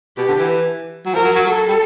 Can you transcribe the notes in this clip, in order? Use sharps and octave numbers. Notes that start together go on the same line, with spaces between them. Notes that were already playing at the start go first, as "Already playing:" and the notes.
B2 G4
D3
E3
F#3
F3 A#4
F#3
F#3
F#3 A4
G3